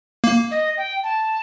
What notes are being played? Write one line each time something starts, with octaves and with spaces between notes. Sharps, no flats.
A#3
D#5
G5
A5